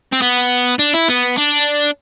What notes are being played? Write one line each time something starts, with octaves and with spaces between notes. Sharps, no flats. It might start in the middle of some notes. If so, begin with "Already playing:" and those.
C4
B3
D4
E4
B3
D4